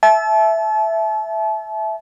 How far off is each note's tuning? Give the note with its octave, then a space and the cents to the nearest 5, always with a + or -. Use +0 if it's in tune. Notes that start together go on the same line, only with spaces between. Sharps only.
E5 +0 A5 -35